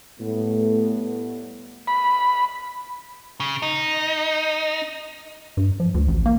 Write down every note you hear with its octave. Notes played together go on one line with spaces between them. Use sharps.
A2 G3 A3 B3
B5
C#3
D#4
G2
F3
D2
A1
A#3